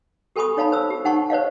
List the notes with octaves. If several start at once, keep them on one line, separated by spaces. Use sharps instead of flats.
G4 A4 G#5 B5 C#6 D#6
D#4 C#5 F5 A5 B5
C5 E6
G4
D#4 F#5 A5 C#6
C5 C#5 D#5 F5